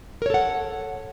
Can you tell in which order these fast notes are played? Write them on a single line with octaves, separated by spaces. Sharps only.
A#4 C#5 A4 F#5